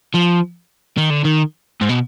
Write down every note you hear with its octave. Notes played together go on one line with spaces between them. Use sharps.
F3
D#3
D3
D#3
G#2
B2